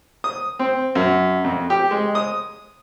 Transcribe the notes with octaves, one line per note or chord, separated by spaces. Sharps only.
D#6
C4
F#2
F2
G4
G#3
D#6